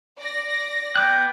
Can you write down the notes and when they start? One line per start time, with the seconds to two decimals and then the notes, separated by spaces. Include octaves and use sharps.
0.18 D5 A#6
0.96 B3 G5 D6 F#6